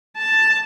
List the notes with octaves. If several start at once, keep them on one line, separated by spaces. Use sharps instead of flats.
A5